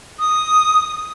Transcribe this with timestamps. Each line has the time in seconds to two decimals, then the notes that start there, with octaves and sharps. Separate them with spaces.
0.19 D#6